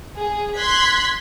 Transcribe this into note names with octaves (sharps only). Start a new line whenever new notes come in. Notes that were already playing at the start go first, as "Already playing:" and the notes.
G#4
C6 F#6 G#6 B6